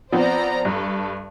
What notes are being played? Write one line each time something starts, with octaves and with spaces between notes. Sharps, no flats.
F3 B3 C4 C5 D5 A#5
G2 A4